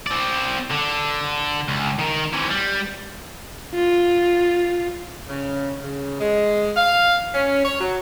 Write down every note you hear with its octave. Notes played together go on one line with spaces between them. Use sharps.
C4 D5
D3
C#2
D#3 A#4
C3 E3
G3
F4
C#3
C#3
G#3
F5
C#4
C#5
F#3